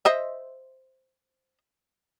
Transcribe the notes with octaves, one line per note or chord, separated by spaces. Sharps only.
C5 D#5 E5